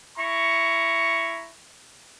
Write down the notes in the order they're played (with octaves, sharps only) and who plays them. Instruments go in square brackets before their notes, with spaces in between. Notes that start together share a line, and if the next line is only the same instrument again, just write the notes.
[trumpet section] E4 A#5 C#6